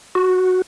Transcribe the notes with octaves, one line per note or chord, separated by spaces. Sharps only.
F#4